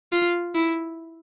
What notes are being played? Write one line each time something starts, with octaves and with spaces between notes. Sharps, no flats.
F4
E4